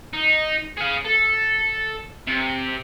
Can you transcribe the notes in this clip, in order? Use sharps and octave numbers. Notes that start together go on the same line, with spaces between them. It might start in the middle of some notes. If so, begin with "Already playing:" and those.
D#4
G#4 F5
A4
C3